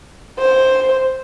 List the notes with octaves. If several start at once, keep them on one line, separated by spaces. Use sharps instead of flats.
C5